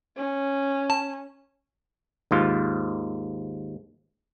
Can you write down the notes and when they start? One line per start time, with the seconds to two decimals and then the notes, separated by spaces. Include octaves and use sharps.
0.17 C#4
0.90 A5
2.31 D#2 G#2 F4